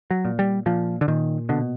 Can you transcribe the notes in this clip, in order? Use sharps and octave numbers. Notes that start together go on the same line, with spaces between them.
F#3
A#2
G3
A#2 F3
D3
A#2 D#3
B2 D3